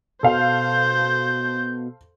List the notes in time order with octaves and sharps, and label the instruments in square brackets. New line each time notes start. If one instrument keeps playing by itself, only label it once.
[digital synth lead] B2 [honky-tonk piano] A4 F5 [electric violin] C5 [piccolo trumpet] G6